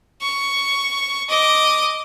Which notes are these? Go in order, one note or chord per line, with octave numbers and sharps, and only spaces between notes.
C#6
D#5 D6